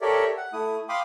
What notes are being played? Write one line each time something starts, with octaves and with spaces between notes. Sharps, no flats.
G4 A4 A#4 C#5 D5 E5
F#5
A3 E4 D#6
F5 G5 B5 C6 D6 D#6